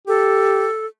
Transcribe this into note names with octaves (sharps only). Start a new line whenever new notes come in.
G4 A4